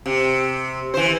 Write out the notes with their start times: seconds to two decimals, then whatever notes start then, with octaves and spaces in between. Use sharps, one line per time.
0.06 C3
0.94 E3 C5